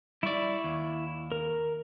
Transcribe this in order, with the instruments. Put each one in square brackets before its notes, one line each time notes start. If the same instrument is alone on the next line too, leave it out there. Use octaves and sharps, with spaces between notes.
[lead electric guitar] G3 D5 [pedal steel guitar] E4 C#6
[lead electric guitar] D#2
[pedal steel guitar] A#4